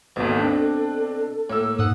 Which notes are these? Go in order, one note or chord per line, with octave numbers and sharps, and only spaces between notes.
G#1 D#2 B2 A4
C4 D4
A2 A#3 E6
G#2 F#5 D#6